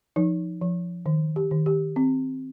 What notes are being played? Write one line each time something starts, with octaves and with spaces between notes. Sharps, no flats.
F3 D#4
F3
D#3
G4
D#3
G4
C4